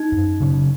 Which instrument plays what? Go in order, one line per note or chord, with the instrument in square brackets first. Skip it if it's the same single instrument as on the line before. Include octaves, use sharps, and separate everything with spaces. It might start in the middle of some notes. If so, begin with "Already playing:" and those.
Already playing: [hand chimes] D#4
[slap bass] F#2
C#3 F#3 C#4